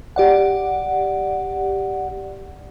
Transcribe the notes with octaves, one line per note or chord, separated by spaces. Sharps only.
G4 D5 F#5